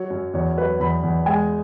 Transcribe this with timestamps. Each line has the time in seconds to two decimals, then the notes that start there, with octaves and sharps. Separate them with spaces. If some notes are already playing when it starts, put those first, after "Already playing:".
Already playing: F#3 C#5
0.10 F#2
0.34 E2 C#5
0.57 F#3 B4
0.80 E2 B5
1.03 E2
1.26 G#3 G#5